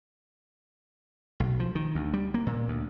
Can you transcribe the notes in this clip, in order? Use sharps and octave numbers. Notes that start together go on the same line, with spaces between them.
B1
F3
D#3
D2
G3
A#3
A#2
D2